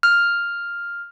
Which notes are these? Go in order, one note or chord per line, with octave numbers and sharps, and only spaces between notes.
F6